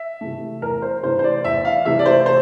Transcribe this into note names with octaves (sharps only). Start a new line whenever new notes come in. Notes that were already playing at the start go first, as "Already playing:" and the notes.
Already playing: E5
C3 E3 A3
E2 A#4
C5
C3 E3 A3 C5
C5
D5
E2 E5
F5
C3 E3 A3 E5
D5
C5
C5